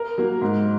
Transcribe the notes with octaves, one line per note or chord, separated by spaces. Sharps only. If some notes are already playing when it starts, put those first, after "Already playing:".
Already playing: A#4
F#3 A#3
G#2